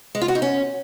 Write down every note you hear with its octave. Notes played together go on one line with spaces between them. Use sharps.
G#3
F4
F#4
D#4
C#4